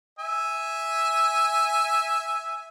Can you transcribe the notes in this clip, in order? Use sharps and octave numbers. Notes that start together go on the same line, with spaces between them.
E5 G#5